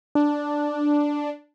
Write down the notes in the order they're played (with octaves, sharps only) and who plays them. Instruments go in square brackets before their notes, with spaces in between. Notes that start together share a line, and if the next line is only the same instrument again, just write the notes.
[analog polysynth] D4